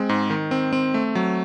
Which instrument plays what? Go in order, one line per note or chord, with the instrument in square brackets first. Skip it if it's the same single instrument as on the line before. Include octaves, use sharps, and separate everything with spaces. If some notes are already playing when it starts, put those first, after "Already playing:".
Already playing: [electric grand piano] G#3 C4
G#2
D#3
C4
C4
A3
F#3